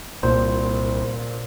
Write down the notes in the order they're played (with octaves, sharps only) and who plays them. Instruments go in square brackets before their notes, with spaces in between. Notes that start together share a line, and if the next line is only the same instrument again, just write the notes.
[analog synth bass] C2 [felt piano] A#2 [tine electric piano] C5